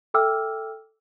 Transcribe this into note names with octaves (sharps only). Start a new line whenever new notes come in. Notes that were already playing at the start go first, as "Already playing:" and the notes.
A4 E5 G5 D6 E6 F6